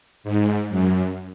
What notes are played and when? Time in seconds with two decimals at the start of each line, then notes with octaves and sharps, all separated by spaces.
0.24 G#2
0.69 F#2